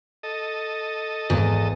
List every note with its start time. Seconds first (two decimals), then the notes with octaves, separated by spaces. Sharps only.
0.23 A4 D#5
1.30 G#1 E2